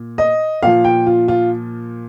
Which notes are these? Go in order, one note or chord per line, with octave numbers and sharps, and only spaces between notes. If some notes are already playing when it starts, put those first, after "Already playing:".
Already playing: A#2
D#5
A#2 F3 F5
G5
F4
F4